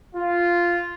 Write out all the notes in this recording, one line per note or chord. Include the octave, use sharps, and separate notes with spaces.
F4